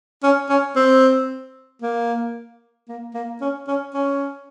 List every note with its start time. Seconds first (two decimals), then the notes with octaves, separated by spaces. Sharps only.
0.23 C#4
0.49 C#4
0.76 C4
1.82 A#3
2.88 A#3
3.14 A#3
3.41 C#4
3.68 C#4
3.94 C#4